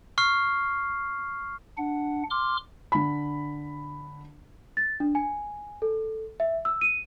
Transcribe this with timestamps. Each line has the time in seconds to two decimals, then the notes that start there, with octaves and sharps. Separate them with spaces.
0.18 C#6 F6 C7
1.78 D4 F#5
2.30 C6 D6 F6
2.92 D3 B5
4.77 A6
5.00 D4
5.15 G#5
5.82 A4
6.40 E5
6.65 E6
6.81 D#7